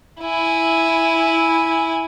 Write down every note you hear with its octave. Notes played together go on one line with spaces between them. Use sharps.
E4 G#5